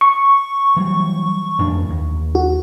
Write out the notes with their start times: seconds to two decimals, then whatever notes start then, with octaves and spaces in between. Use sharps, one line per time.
0.01 C#6
0.76 E3 F#3 G3
1.59 A1 F2 D4
1.89 D#2
2.35 F#4